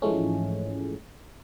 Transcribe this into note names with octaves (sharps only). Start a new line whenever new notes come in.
G#2 E3 F3 G#3 A3 C#4